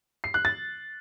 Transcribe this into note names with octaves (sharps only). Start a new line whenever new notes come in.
C7
F#6
A6